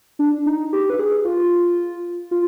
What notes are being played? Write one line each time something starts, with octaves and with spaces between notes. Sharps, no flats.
D4
D#4
G4
B4
G#4
F4
F4